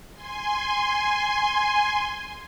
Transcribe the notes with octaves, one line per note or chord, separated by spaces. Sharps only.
G#5 C6